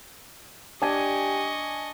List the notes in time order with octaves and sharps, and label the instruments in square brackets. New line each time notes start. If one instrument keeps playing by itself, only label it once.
[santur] D4 G#5 [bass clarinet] G4 [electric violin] D#5 C#6